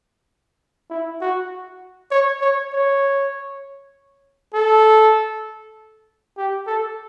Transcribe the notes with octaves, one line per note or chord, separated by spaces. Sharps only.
E4
F#4
C#5
C#5
C#5
A4
G4
A4